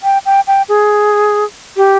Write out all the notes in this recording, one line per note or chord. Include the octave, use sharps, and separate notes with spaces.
G5
G5
G5
G#4
G4